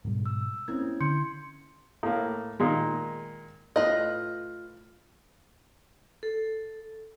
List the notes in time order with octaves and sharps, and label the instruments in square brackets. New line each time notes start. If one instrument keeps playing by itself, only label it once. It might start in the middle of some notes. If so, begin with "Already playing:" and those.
[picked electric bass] G#2 B2 G3
[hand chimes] E6
[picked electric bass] A#3 C4 [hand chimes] C#4 E4 G#6
[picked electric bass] D3 [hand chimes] C6 G6 C#7
[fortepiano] A2 A#3
A#2 D#3 G#3
[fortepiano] A2 [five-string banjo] F4 B4 D#5
[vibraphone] A4